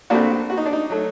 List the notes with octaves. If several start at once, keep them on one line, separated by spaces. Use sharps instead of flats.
A#1 A#2 A3 C4 D4 F#4
F#4
D#4
D4
D#4
F#3 A3